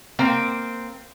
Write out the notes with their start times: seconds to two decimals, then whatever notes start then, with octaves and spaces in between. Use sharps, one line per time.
0.19 A#3 C4 G5